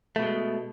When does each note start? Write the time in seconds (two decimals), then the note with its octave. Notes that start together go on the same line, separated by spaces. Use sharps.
0.16 A3
0.19 B2
0.22 G#3